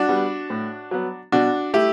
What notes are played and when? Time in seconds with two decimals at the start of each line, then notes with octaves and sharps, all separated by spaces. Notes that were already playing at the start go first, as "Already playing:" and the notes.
Already playing: D4 F#4
0.08 G3 B3
0.50 A2
0.91 F#3 B3
1.32 B2 D4 F#4
1.74 A3 E4 G4